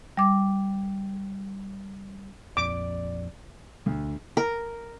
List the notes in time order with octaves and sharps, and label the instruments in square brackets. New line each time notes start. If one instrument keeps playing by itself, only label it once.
[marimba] G3 D6
[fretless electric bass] A#1 F2 [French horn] D5 [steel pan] D6
[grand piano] D2
[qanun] A#4